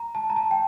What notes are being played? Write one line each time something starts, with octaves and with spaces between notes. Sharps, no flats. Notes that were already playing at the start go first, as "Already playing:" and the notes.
Already playing: A#5
A5
A#5
A5
G5